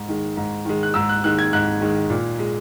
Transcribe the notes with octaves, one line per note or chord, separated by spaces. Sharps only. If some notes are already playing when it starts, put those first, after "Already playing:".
Already playing: G#2
D#3 G#3
G#2
D#3 G#3
F#6
G#2 E6
F#6
D#3 G#3 F#6
G#6
G#2 F#6
D#3 G#3
A#2
G#3